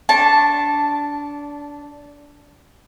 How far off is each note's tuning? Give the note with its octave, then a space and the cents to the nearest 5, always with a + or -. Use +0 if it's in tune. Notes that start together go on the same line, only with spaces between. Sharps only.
D4 -20 A5 +0 C#6 -35